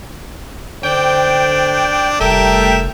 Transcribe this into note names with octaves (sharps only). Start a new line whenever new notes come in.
D3 D4 C5 G5
F1 G3 A3 A4 A#4 E5 G5